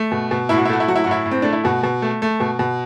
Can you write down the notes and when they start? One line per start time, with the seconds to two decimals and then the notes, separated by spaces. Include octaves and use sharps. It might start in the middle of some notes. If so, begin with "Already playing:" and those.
Already playing: A3
0.12 B2
0.31 B2
0.49 A2 E4
0.58 F#4
0.65 E4
0.69 A3 F#4
0.80 E4
0.88 F#3 F#4
0.96 E4
1.04 F#4
1.07 A2 E4
1.26 A2
1.31 C4
1.42 A3 D4
1.53 E4
1.64 B2 F#4
1.83 B2
2.02 A3
2.22 A3
2.40 B2
2.59 B2